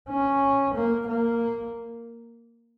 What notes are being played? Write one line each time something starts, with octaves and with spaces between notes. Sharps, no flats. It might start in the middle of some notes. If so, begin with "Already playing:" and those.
C#4
A#3
A#3